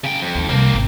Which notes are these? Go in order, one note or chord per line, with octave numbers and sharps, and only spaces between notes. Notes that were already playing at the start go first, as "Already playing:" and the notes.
C#3 G5
F2
D#2
C2 A#3 C4
G#1